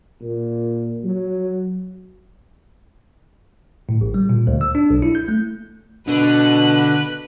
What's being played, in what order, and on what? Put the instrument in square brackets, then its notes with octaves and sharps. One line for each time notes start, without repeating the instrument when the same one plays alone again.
[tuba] A#2
F#3
[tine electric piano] A2
A1
G3
A#2
D2
E6
D4
B1
E4
G6
A3
[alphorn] B2 [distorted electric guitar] D3 [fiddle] B4 F#6